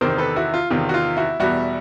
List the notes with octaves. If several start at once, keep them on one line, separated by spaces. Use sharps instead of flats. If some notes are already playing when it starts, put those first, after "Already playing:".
E2 C3 D#3 A#4 C5
A4 B4
E4 F#4
F4
E2 C3 D#3 F4
F#4
F4
E4 F#4
E2 B2 G3 E4 F#4